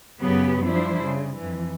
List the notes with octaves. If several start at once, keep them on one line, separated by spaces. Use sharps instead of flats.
F#2 C#3 F#3 B3 G4 B4
F3 G3 D4 E4 C5
C#3
F2 E3